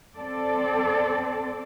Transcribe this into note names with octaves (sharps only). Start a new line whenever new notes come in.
C4 A4 D5